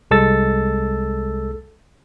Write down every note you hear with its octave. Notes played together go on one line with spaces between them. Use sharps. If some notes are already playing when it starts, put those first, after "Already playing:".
C2 G#3 A4 E6 A6